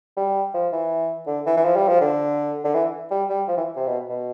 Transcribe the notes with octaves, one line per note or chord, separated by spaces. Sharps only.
G3
F3
E3
D3
E3
E3
F3
G3
F3
D3
D3
E3
G3
G3
F3
E3
C3
B2
B2